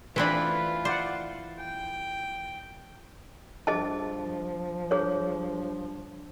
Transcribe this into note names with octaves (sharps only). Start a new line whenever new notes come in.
E3 A3 C4 D4 F4 B4 B5
C5 D5 F#5
G5
G2 F3 G#4 D#5 A5
G2 G#4 C#5